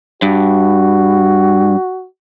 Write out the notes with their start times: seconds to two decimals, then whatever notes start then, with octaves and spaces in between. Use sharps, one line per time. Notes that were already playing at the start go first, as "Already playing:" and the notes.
0.22 G2 F#4